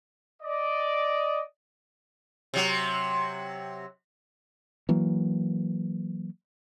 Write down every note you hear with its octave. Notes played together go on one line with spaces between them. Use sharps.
D5 D#5
C3 F#3
E3 F#3 A#3